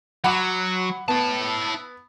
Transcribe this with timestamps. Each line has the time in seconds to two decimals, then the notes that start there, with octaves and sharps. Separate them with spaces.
0.24 F#3 F#5 B5 D6
1.08 B3 E4 A5